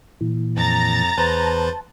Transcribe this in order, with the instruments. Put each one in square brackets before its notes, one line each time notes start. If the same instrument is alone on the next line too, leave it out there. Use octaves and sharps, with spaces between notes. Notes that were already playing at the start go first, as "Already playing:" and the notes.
[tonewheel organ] A#2 E3
[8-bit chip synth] F2 [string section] A#5 A6
[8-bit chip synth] E2 B4 C5 [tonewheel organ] A5